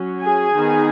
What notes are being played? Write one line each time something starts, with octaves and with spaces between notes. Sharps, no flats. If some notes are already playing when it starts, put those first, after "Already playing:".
Already playing: F#3 C#4
G#4 G#5
D#3 B3 D#4